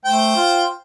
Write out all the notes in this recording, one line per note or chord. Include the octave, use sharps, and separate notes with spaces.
A3 C5 G5
F4